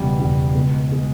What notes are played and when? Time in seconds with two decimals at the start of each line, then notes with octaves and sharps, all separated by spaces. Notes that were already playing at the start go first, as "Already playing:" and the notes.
Already playing: E1 E2 C#3 G3
0.20 E1 E2 C#3 G3
0.55 C#2 B2 G#3
0.92 B2 G#3